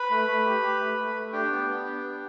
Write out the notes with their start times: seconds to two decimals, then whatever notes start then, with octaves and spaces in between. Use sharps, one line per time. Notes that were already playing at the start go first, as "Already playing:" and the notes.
Already playing: B4 B5
0.10 A3
0.28 A3
0.45 G4
0.62 G4
0.80 A3
0.98 A3
1.15 A3
1.33 D4 G4 G5
1.50 B3
1.68 B3
1.85 D4
2.03 B3